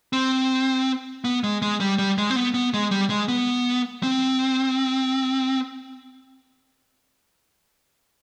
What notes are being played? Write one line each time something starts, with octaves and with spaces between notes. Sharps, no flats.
C4
B3
G#3
G#3
G3
G3
G#3
C4
B3
B3
G#3
G3
G#3
B3
C4